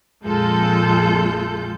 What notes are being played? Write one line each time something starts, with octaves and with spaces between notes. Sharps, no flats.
A#1 F2 G#3 F4 A4 G6